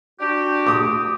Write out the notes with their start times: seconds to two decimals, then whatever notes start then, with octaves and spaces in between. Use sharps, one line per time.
0.20 D4 F#4 G4
0.67 D6 D#6